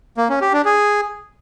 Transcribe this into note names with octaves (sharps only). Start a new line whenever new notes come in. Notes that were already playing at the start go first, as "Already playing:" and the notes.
A#3
C#4
G4
D4
G#4